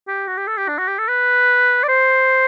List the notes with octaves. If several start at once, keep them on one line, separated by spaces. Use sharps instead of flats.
G4
F#4
G4
A4
G4
D4
F#4
G4
A4
B4
D5
C5